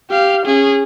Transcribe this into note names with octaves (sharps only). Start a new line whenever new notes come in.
G4 F5
C#4 G#4